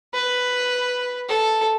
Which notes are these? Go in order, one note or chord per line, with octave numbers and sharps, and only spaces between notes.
B4
A4